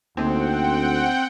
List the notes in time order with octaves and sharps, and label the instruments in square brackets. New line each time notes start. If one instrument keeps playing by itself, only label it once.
[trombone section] D2 [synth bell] A#3 D#4 [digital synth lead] C4 [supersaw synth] F#5 G5